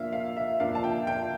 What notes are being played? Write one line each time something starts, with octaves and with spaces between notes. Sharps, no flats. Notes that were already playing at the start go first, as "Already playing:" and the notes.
Already playing: A#2 F3 A#3 D4 E5 F5
F5
E5
A#2 F3 A#3 D4 F5
A5
G5
G5